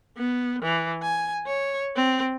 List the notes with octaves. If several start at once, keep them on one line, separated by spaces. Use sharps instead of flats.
B3
E3
G#5
C#5
C4